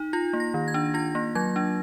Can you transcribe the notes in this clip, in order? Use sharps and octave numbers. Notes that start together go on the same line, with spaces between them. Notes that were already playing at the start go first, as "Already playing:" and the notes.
Already playing: D#4
F4 A#6
A#3
A#6
D#3
G#6
D4
F4 A#6
A#3
F#3 G#6
D4